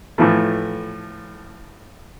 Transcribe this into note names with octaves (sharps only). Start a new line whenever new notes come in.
A2 E3 F3 A3